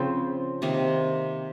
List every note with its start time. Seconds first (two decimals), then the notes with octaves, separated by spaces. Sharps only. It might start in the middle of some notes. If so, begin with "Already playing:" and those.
Already playing: C#3 F3 C4
0.62 C3 D#3 A#3